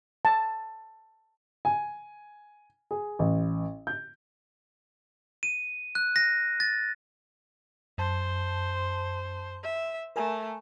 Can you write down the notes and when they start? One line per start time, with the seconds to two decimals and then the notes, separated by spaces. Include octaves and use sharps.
0.25 A5
1.65 G#5
2.91 G#4
3.19 A1
3.87 G6
5.43 D#7
5.95 F#6
6.16 A#6
6.60 A6
7.98 F#2 C5 A5
9.63 E5
10.16 A3 A#4 G#5 A#5